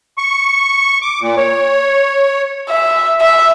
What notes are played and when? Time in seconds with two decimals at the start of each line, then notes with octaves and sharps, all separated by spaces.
0.18 C#6
1.02 D6
1.21 A#2
1.37 C#5
2.69 E5
3.21 E5